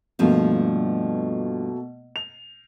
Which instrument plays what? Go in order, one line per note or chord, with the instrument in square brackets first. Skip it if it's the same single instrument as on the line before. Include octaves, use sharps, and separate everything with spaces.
[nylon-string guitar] G2 F3 G3 [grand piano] B2 A3 A#3
[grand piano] F7